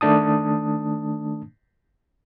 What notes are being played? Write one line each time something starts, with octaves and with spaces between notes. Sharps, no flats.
D#3 A3 D4 A5 D#6